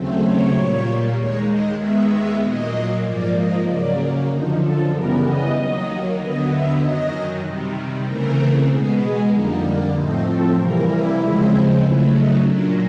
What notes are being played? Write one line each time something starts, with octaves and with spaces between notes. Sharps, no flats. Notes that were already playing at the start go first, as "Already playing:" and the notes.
Already playing: D#2 C#3 F#3 A3 C4
C#5
A#2 G3 A#3
D#2 D#3 G#3 C#5
D#5
D#2 D#3 G#3 B3 E5
E5
A#2 F#3 A#3 D#5
G#2 F3 A#3 D5
D#5
C#3 F#3 A#3 D5
F#2 D3 F3 D#4
A4
C#3 E3 G3 B3 A#4
D#5
D#2 D#3 F#3 A#3
D#2 D3 F#3 B3 D#5
E5
F#2 D#3 F#3 D#5
C3 D#3 G3
C#3 E3 A3 C4 A#4
B2 G#3 B3 G#4
G#4
F2 D3 G3 A#3 D#4
D4
A2 F3 A3 C4 D#4
A4
C3 E3 G3 A#3 A#4
E4
D#2 C#3 F3 G#3 C4
C#3 F#3 A3 E4
D#4
A#2 F#3 A#3 D4